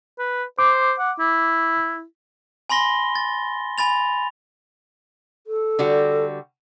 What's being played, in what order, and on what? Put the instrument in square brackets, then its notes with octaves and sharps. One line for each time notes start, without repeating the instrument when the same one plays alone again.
[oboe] B4
[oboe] C5 [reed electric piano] D6
[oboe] F#5
E4
[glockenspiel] G#5 B5 C6 A#6 G7
A6
G#5 B5 A6 F7
[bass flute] A4
[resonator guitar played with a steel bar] D3 G3 F#4